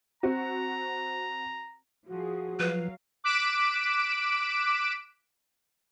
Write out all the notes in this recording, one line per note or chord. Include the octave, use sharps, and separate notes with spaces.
C4 F#4 A#5
F3 F#4 G#4
F3 F#3 B4 F5
D6 F#6 B6 D7 E7